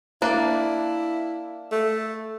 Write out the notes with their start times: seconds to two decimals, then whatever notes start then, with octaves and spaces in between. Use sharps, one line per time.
0.22 A#3 D4 E4
1.72 A3